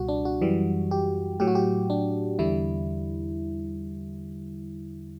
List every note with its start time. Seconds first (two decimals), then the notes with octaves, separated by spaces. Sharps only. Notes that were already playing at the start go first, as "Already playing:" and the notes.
Already playing: C#2 B2 G3 F#4
0.08 D4
0.25 F#4
0.41 F#2 E3 G3
0.91 G4
1.40 A2 F#3 G4
1.47 F#4
1.55 G4
1.90 D4
2.39 E2 D3 G3 E4